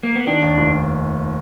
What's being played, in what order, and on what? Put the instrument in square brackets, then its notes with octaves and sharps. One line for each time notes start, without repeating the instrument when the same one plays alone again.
[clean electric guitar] A#3
B3
[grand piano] D#3 [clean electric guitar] D4
[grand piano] D#2
F1